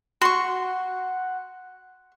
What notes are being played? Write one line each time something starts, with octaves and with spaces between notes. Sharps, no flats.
F#4 F#5 C6 C#6